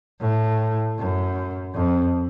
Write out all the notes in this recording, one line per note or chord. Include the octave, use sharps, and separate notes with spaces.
A2
F#2
F2